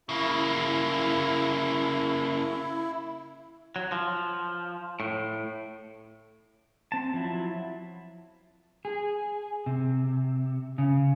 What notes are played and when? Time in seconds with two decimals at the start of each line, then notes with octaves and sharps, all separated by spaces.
0.09 C#3 A#3 E4
3.76 F#3
3.92 F3
5.00 A2
6.92 C4 A5
7.14 F3 F#3 E4
8.85 G#4
9.66 C3
10.78 C#3